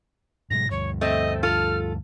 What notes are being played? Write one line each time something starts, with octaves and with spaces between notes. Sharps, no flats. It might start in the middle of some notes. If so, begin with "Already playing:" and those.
G#2 B2 G3 A#6
D2 G2 C#5
A3 C4 D#5
F4 A4 F6